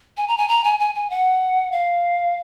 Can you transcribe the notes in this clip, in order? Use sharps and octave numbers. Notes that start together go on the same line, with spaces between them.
G#5
A#5
G#5
A#5
G#5
G#5
G#5
F#5
F5